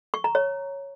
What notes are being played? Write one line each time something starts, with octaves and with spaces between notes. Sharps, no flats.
C#6
A#5
C#5